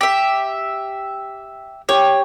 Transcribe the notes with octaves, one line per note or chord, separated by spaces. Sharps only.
G4 E5
G4 C#5